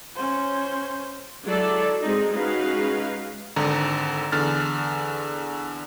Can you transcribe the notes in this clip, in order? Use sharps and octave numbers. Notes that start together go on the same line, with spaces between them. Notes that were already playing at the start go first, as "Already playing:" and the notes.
C#4 C5
F#3 G#3 E4 A4 D5
G#3 C4 D#4
G#3 C#4 D#4 F#4 B4 F5
G#1 D3 A#5
E2 D3 F6 A6